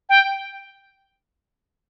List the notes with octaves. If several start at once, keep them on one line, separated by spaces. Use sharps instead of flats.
G5